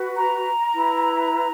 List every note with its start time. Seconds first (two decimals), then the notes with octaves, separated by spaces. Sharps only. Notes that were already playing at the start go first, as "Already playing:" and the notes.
Already playing: F#4 B4
0.16 A#5
0.74 E4 B4